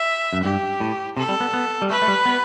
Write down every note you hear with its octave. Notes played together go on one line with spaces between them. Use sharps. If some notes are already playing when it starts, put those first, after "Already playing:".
Already playing: E5
F#2
G2 G4
A2
C3 A4
G3
B3
B3
G3
A3 B4
A3
G3
B3